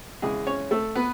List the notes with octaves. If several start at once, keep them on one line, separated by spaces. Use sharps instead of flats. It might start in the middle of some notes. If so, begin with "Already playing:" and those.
E2 C#3 G#3 G#4
C#4 C#5
A3 A4
B3 B4